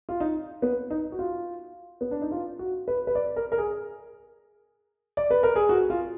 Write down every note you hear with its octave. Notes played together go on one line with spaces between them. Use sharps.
F4
D#4
B3
D#4
F#4
F4
B3
D4
D#4
F4
F#4
B4
B4
D5
A#4
A#4
G#4
D5
B4
A#4
G#4
F#4
F4